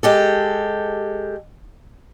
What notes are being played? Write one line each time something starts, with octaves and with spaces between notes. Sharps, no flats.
G#3 G4 A4